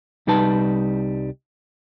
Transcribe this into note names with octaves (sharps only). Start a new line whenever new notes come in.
C2 G3 D#4 B4 A5